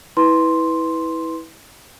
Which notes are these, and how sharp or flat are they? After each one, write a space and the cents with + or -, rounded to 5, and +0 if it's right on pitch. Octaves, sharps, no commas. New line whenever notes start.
E4 -25 B4 +0 C6 +0